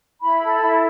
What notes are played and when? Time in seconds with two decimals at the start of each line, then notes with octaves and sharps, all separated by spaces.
0.22 E4 B5
0.42 A4
0.60 E4